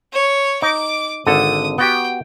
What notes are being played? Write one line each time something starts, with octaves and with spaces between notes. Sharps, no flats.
C#5
D#4 D6
G#1 D3 A4 D#6
B3 F#4 G4 G5